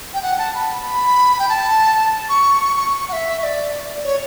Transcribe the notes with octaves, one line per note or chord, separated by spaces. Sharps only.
G5
F#5
A5
B5
B5
G5
A5
C#6
C#6
F#5
E5
E5
D5
C#5